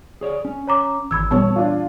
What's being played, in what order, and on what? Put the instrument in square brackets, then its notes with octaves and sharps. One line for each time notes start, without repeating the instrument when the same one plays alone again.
[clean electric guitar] G#4 C#5 D5
C#4
[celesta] C#5 A#5 D6
[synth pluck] G#1 B5 [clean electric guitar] E2 [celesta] E6 G#6
[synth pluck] A#2 G3 B3 [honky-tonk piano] C#5 A5
[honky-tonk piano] D4 F4